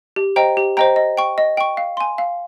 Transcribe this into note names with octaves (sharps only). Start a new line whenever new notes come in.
G4
C5 D#5 G5 A#5
G4
C5 D#5 G5 A#5
D#5
G5 C#6
D#5
G5 C#6
F5
G#5 C6
F5